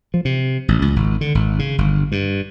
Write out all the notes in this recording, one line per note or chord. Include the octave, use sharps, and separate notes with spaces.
F3
C3
A1
C#2
G#1
D3
G#1
C#3
G1
G2